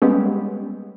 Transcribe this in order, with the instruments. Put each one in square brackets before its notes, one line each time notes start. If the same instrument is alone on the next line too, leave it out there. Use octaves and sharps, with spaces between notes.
[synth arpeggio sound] G3 G#3 A#3 B3 C#4 G4